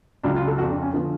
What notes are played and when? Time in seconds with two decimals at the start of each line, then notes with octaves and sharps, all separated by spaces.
0.23 C#2 C#3 F#3 D4
0.36 F4
0.47 A4
0.58 F2 F3 F#4
0.70 D4
0.82 C#4
0.93 D3 F3 B3